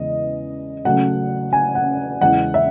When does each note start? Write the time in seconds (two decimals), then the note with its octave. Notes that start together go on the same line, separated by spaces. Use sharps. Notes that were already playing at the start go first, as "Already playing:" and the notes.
Already playing: E2 C#3 G#3 B3 D#5
0.85 C#3 F#3 A3 F#5
1.53 G#5
1.75 F#5
2.21 E2 C#3 G#3 F#5
2.54 E5